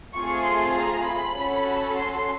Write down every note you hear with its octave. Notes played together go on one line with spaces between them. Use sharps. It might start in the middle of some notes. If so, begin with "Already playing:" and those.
A3 C4 F4 G#4 C#6
C6
A#5
B5
C#4 F#4 A4
C6